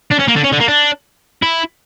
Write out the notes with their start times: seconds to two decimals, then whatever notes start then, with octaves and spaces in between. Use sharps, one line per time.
0.11 D4
0.19 C#4
0.28 A#3
0.36 D3
0.44 C#4
0.52 D3
0.60 A#3
0.68 D4
1.42 E4